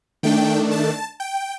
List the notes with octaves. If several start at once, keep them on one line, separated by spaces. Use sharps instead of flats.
D#3 A3 D4 G5
A5
G5